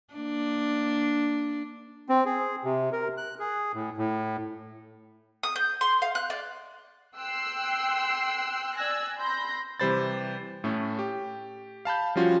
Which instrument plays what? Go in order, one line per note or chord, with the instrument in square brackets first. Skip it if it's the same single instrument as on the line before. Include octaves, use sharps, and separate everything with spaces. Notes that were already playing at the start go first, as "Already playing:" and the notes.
[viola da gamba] A#3 D4
[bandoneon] C4
G#4
C3
A#4
F#6
G#4
A2
A2
[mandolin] D#6
G6
C6
F5
F#6
D5
[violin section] G5 C6 E6 F#6 C7
D5 G#5 E6 F#6 G#6 A#6
B5 C6 G6 A#6
[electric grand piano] C3 E3 G3 C5 B5 A6
A2 A3 C#4
G4
F5 A5 B5 G6
F3 G3 C#4 F4 F#4